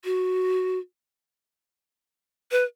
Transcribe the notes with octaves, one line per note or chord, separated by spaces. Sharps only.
F#4
B4